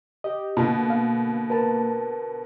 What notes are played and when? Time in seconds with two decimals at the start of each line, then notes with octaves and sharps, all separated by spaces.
0.24 G4 D#5
0.57 B2 D3 A#3
0.90 F5
1.50 A#4 B4 A5